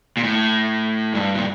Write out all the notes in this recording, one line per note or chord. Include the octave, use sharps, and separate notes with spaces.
A#2
A2
G2
A#2